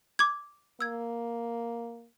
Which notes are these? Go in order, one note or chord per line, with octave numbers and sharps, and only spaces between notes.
D6 G#6
A#3 E6 G#6